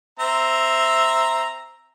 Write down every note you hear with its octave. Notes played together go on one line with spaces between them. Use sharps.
C4 E5 A#5